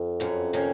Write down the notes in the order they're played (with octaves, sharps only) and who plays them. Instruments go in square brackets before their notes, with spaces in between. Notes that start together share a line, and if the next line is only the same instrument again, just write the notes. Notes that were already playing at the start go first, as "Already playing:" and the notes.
Already playing: [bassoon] F2
[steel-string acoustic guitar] F#2 C#3 F#3
C3 D#3 A#3 C#4